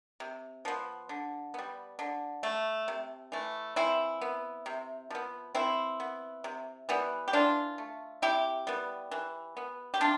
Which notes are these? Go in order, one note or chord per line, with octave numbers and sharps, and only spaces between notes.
C3
F3 B3
D3
G3 B3
D3
A3
C3
E3 A3
E3 C4 E4
B3
C3
F3 B3
E3 C4 E4
B3
C3
E3 G3 B3
G4
E3 D4 F4
A3
C3 E4 G4
G3 B3
E3
B3
G4
C3 D4 F4